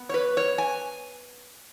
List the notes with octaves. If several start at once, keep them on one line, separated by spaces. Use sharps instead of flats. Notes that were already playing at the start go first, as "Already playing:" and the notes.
Already playing: B3
C#5
B4
C#5
G#5